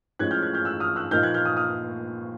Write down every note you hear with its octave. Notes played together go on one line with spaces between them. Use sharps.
A2 F3 G#3 C#4 F#6 G#6
F6 G6
F#6 G#6
F6 G6
E6 F#6
D#6 F6
E6 F#6
A#2 F3 A#3 D#4 F6 G6
F#6 G#6
F6 G6
D#6 F6
D#6 F6